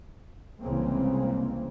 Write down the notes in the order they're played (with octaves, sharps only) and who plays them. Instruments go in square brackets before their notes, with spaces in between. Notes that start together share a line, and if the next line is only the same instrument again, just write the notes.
[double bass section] C2 C#3 E3 G#3 A#3 C4